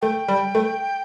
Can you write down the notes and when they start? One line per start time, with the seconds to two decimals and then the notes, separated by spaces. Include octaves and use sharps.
0.02 A3 G5
0.28 G3
0.55 A3